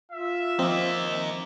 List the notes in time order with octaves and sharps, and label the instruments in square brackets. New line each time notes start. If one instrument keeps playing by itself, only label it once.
[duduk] F4 [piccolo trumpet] E5
[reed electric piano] F3 C4 [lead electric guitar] A#3 D#4